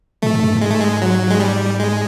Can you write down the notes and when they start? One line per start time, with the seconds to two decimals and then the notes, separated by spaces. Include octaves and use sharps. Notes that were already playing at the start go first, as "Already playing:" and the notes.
0.22 A2 A3
0.33 G#2
0.43 G2
0.55 G#2
0.61 G#3
0.70 A3
0.80 G#3
1.02 F#3
1.30 G#3
1.40 G3
1.80 G#3